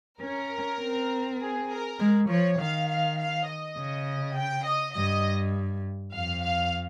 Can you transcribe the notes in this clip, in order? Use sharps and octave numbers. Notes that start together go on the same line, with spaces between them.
C#4 A#4
C4
G#4
A#4
G#3
F3 C#5
D#3 F5
F5
F5
D#5
C#3
G5
D#5
G2 D#5
F2 F5
F5